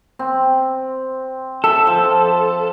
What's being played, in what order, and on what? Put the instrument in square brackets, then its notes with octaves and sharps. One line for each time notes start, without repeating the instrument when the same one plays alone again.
[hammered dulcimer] C4
[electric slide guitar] A4 [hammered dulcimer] E5
[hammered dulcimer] F3